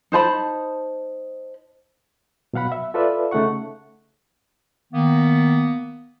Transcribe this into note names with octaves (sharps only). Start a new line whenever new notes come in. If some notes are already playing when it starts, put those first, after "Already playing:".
D#4 C5 A5 B5
B2 F#3 F5 F#5 B5
E5
F4 A4 B4 D5 E5
C#3 A3 D#4 F#5 C#6
D#3 A#3 B3